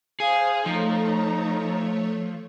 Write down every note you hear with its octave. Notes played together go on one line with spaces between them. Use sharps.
G#4 C5 F5 D#6 F6
F3 A3 D#4 C#5 A#5